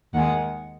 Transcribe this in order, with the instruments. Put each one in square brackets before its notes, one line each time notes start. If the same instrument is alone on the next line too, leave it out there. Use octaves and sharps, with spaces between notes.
[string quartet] D#2 D#3 G#3 F#5